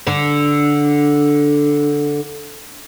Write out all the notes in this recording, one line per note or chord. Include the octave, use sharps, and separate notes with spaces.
D3 D4